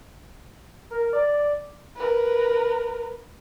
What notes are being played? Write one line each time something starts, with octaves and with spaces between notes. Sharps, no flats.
A#4
D5
A#4 B4